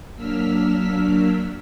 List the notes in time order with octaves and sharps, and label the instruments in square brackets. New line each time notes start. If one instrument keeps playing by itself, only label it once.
[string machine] F#3 A#3 D4 E6 F6 B6